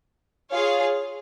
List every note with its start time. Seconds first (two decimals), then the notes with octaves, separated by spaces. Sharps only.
0.50 F4 G#4 C#5 F5